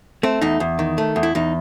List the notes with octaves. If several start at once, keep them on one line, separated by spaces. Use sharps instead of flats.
A3 C4
E2 D#4
E2
D#3
A3
E2
E4
E2 D#4